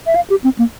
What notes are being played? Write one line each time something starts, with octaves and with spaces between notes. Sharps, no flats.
E5
F5
G4
C4
A#3